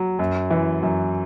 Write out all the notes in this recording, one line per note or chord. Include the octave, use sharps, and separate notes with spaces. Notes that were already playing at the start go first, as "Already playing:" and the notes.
Already playing: F#3
F#2
E3
F#2